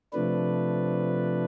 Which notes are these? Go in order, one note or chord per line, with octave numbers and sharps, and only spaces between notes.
C3 F3 A3 D4 B4